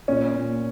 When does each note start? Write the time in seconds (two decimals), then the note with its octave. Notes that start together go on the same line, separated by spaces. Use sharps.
0.08 A#2 C#4
0.35 A#2